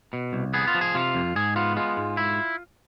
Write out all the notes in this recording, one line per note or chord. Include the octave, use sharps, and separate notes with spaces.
B2
C2
B3 G#4
F4
F3
G#4
C3 F4
F2
G#2 G#4
B3 F4
G#3 F4
G#2
E4